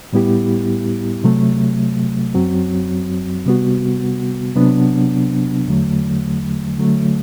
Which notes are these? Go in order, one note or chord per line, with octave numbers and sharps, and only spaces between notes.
A2 G3 B3 E4 G4
C3 F#3 A3
F#2 F#3 C4 F#4
C3 G3 B3 F#4
C3 F#3 B3 D4
E2 D3 F#3 A3
D3 F#3 A3